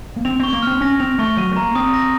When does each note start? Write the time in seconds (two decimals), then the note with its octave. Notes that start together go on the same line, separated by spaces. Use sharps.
0.16 A#3
0.25 C4 F7
0.40 C4 C#6
0.53 A#3
0.63 C4 F6
0.81 C#4 A#6
1.00 C4 F7
1.18 A3 C#6
1.37 F#3 D#7
1.52 A3
1.56 A#3 A#5
1.75 C4 D#6
1.94 A#6